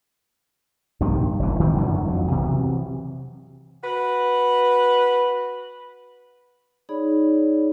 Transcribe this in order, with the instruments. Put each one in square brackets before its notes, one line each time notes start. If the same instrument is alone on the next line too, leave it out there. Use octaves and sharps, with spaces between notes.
[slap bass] A#1 G2 C3 D#3
F#1 D2 E3
D#3 E3 C4
F#2 D3 E3 F#3
B1 F2 F#3
C3 E3 F#3
[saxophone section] F#4 B4
[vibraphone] D#4 G#4 C#5 D5 B5